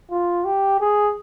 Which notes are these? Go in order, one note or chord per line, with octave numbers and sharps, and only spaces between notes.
F4
G4
G#4